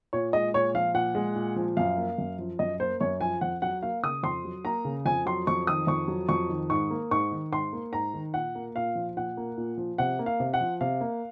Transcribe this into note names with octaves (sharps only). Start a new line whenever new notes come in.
A#2 C#5
G#3 D#5
A#2 C#5
F3 F5
A#2 F#5
G#3
A#2
F3
F#2 F5
A#3
F#2
F3
F#2 D#5
A#3 C5
F#2 C#5
F3 G#5
F2 F#5
F#3 F#5
A#3 F5
C#3 D#6
F2 C6
F#3
A#3 A#5
C#3
F2 G#5
F#3 C6
F2 C#6
D#3 D#6
F2 C#6
F#3
F2 C#6
D#3
G#2 C#6
A#3
G#2 C#6
D#3
G#2 C6
A#3
G#2 A#5
D#3
A#2 F#5
A#3
A#2 F5
F3
A#2 F#5
A#3
A#2
F3
C3 F#5
A#3
F5
C3
F#5
F3
C3 F5
A#3